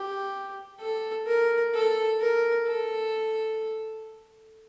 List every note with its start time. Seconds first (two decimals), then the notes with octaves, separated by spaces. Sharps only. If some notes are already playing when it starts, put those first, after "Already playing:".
Already playing: G4
0.80 A4
1.27 A#4
1.74 A4
2.21 A#4
2.68 A4